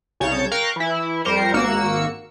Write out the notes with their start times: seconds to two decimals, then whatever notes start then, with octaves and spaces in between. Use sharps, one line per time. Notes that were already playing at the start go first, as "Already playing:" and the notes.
0.20 C2 C#3 C#5 A5 G6 A6
0.52 A#4 F5 G5 C#6 F#6
0.76 E3 E4
1.25 F2 G3 A#4 C5 C#7
1.54 G#1 A#3 F#4 E6 C#7